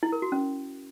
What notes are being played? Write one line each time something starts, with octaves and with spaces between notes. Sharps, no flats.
E4
A#4
F#4
C#4